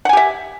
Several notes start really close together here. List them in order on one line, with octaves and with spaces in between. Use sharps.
F#5 G#5 G4 E5